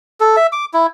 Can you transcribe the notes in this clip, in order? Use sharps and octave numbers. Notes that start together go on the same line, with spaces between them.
A4
E5
D6
E4